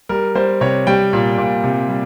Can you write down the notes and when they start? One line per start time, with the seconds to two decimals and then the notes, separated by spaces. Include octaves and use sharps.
0.09 G3 A#4
0.35 G3 C5
0.61 C3 C#5
0.87 G3 G5
1.13 A#2
1.38 A#2
1.64 C3
1.89 G3